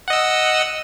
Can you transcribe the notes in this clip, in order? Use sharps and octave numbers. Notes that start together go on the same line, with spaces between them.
D#5 F#5 E6